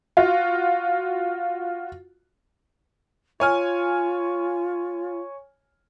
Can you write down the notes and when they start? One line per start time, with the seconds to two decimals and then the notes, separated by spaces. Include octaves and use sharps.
0.17 F4 F#4
3.40 F4 C#5 G#5 F6